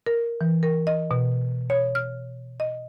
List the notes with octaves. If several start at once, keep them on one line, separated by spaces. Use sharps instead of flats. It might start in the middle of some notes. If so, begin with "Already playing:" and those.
A#4
E3
A#4
D#5
B2
C#5
F6
D#5